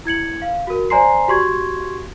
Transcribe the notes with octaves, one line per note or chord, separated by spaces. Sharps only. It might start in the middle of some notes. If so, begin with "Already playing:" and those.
E4 G#6 C#7 F#7
F5
F#4 A#4
C5 D5 G#5 A#5 C6 C7
F#4 G4 C6 C#6 G#6